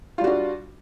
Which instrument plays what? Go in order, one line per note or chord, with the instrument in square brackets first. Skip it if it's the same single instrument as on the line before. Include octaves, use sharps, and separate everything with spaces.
[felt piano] F4
G3
F#4
D4